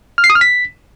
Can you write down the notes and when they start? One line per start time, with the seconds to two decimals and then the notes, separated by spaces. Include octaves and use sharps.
0.18 F6
0.24 C7
0.30 D#6
0.35 F6
0.41 B6